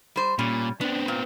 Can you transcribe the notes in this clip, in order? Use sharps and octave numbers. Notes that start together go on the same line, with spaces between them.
G3 C5
A#2 G3 C#4
B3 C4 D4
A#2